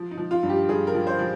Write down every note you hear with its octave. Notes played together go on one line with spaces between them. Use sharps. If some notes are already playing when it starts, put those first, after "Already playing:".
Already playing: F3
D#4
F3
F4
G2
G4
G2 G#4
A#4
F3
C5
F3